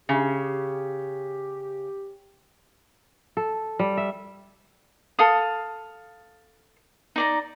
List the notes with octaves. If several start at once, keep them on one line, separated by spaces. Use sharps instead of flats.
C#3 G4
A4
G3
E5
A4 F5 D#6
D#4 D5 A#5